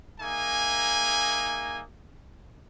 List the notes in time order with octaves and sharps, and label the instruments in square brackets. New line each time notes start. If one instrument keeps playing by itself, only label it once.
[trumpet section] A#3 D#4 G#4 E5 G#5